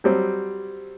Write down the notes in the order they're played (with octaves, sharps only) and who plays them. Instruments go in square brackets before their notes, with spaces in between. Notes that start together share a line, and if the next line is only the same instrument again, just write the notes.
[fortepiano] F#3 G3 C4